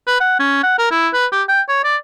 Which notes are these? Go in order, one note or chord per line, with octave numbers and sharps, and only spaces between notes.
B4
F#5
C#4
F#5
A#4
E4
B4
G4
G5
C#5
D5